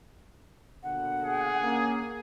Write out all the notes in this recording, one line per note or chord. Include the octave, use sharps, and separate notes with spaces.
D#2 B2 D3 F#5
G#4
A#3 C#4